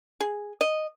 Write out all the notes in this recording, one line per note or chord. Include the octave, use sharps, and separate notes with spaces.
G#4
D#5